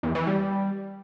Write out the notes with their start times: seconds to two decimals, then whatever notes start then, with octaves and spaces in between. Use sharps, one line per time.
0.03 E2
0.15 E3
0.27 G3